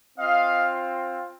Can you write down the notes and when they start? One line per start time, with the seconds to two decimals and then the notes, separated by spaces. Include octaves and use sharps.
0.18 C4 F4 D#5 F5